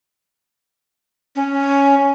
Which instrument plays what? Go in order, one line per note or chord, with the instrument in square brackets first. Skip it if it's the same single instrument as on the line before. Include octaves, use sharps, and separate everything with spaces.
[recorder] C#4